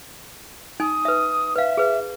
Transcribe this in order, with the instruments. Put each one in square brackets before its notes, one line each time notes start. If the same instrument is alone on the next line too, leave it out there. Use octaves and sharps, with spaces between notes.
[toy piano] D#4 G#5 [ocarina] D#6
[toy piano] B4 E5
[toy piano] B4 F5 [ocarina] E5
[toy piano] G#4 B4